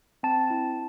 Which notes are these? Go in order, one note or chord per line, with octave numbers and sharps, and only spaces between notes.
C4 A5
E4